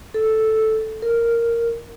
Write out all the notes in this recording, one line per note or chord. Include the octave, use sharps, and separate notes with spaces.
A4
A#4